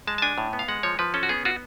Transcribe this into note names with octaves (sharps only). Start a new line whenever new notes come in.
G#3 A5
A5
D4 G#5
A2
B3
F5
G#3 F#5
F3 C#5
F3 B4
C#4 A4
F#4
B3 G#4
F4 F#4